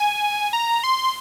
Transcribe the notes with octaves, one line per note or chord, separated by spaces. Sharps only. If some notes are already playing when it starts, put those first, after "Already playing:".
Already playing: G#5
A#5
C6